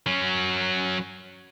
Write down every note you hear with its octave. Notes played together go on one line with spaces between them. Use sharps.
F#3 C#4